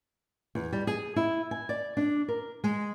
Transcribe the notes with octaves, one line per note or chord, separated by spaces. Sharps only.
E2
G3
G#4
E4
G#5
D5
D4
A#4
G#3